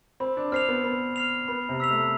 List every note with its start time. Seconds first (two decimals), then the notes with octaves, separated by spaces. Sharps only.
0.20 C4 B5
0.37 D4
0.52 C4 F6 C7 F7
0.68 B3
0.84 B3 B5
1.16 F6 C7 F7
1.48 B3 B5
1.69 C3
1.80 E6 B6 F7
1.91 A3